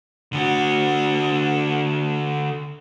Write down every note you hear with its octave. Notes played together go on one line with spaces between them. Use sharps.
D3 F#4